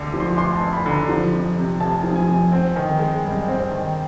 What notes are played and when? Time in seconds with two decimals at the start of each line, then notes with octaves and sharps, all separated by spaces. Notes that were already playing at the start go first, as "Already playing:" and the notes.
Already playing: D2 D3
0.14 F3
0.20 C6
0.37 D2 C6
0.56 D2 A5
0.73 B5
0.86 D3
0.91 A#5
1.09 F3
1.33 F2
1.57 C3
1.80 F1 A5
2.04 F3
2.16 G#5
2.28 F2
2.52 C4
2.76 D#3
2.99 G#3
3.24 G2
3.48 C4
3.71 D#3